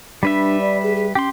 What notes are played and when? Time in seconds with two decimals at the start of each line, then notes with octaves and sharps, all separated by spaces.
0.23 G3 D4 B4 E5
0.61 D5
0.83 G#4
0.95 G#4
1.15 C#4 G4 C6